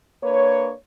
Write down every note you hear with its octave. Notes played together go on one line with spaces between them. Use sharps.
A#3 D4 B4 C#5